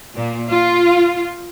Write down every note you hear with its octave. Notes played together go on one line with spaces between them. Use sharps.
A#2
F4